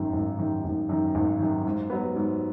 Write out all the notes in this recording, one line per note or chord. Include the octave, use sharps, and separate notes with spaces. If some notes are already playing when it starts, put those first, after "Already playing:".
Already playing: G#1 F#2 D#3
G#1
F#2 D#3
G#1
F#2 D#3
G#1
F#2 D#3
G#2
F#3 B3
G#2